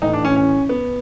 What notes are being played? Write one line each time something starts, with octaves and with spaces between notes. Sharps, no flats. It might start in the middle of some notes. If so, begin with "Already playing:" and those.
A1 A2 E3 D#4
D4
C#4
C#4
B3